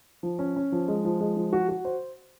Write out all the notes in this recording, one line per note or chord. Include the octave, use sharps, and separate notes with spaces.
F3
C#4
C#4
F3
G#3
F3
G#3
F3
F#4
F#4
C5